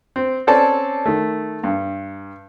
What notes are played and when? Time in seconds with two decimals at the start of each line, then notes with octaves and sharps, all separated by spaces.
0.16 C4
0.47 C4 C#4 A4 D5 A5
1.06 D#3 A3
1.64 G2